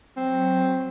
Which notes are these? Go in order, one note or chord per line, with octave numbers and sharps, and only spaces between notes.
F#3 C4